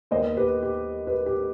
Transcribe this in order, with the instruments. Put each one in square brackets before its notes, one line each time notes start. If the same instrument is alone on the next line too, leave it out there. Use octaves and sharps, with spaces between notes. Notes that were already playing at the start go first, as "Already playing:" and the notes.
[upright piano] D#2 D#3 B3 C5 D#5
G4 B4
G4
G4 B4
G4